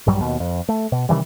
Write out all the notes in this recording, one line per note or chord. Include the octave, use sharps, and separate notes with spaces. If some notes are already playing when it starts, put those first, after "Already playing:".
A#1 G2 F#3 G3
D#2 B2
F2
A3
B2
C3 D#3 E3 G3